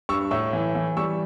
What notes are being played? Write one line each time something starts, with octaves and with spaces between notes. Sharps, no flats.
G2 C#6 E6
A2 C#6 E6
E3
E3
G3 C#6 E6